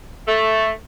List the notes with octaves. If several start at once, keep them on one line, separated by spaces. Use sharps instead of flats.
A3